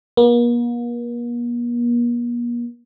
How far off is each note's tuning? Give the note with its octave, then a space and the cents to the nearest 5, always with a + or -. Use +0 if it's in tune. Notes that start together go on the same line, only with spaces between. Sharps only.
A#3 +45